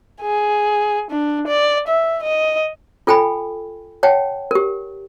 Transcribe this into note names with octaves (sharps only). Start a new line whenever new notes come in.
G#4
D4
D5
E5
D#5
F4 A4 G5 G#5 B5
C#5 F#5 G5 A5
G4 A#4